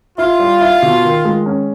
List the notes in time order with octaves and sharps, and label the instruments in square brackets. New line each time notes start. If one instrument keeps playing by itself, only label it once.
[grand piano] E4 [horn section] F4
[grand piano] G3
E4
B2
D#3
G#3
C#4